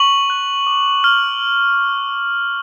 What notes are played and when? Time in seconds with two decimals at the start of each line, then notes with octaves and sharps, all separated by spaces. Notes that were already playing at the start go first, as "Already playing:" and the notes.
Already playing: C#6 F#7
0.30 F#6
0.67 D6
1.04 F6